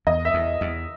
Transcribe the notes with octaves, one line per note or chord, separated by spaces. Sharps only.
E2 D#5
E5
E2
E2